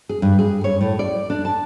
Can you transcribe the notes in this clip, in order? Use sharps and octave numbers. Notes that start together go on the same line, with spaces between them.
G#4
G2
G#4
C#5
A2
D5
D4
A5